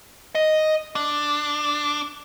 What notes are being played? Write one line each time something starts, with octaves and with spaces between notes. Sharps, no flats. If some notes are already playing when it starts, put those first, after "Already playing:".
D#5
D4